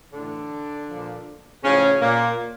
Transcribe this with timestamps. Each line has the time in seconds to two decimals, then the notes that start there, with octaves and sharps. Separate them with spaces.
0.13 A2 D3 E3 D4
0.88 A#2 F3
1.64 A2 C#3 F3 C#4
2.02 A#2 A#3